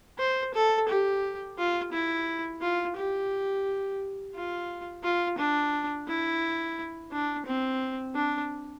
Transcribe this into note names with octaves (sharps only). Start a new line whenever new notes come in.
C5
A4
G4
F4
E4
F4
G4
F4
F4
D4
E4
D4
C4
D4